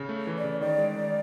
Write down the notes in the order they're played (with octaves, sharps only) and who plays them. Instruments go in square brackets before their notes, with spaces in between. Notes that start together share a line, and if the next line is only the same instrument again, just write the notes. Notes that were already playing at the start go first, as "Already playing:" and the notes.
Already playing: [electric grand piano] C#3
A3
E3
[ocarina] D5
[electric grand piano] C#3
[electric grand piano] D#3 [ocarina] D5
[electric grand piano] G#3
D#3